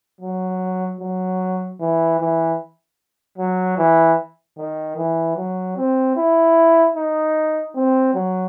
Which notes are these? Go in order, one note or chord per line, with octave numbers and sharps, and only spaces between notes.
F#3
F#3
E3
E3
F#3
E3
D#3
E3
F#3
C4
E4
D#4
C4
F#3